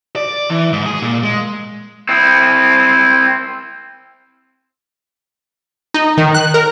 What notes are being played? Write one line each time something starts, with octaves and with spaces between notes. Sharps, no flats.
D5
E3
G#2
G#4
A#2
G#3
C4 E4
D#4
D#3
F#6
A#4